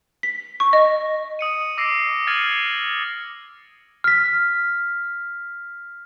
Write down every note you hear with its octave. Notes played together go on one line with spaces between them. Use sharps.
B6
C#6
D#5
D#6 C#7 D#7
D6 E6 A#6 C7 D7
F6 G#6 A6 C#7 D#7 F#7
F6 B6